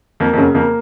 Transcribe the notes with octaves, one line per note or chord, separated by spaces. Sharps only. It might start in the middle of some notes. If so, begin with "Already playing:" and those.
F2 A#3
F2
F#2 C#3
F2 A#3